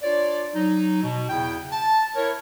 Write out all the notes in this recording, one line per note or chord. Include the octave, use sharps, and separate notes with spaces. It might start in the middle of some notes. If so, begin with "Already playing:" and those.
D4 F4 C#5 D5
F#3 D#4
B2
E2 C#3 E4 G5
A5
E4 A#4 C#5